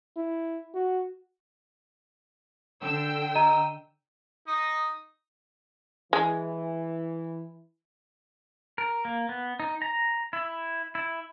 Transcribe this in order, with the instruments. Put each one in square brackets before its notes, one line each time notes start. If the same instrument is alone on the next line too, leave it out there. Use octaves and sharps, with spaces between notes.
[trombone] E4
F#4
[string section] D3 G5 E6
[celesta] D#5 A#5 D#7
[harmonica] D#4 D#6
[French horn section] E3 [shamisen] G#3
[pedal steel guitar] A#4
A#3
B3
D#4
A#5
E4
E4